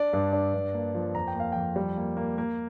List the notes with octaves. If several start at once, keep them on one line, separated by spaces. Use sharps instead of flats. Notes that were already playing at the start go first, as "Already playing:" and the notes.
Already playing: D4 D5
G2
D4
G2
A#3
F3
F2 A#5
G5
A#3 F5
F2 G5
G3
A#3
A#3
A#3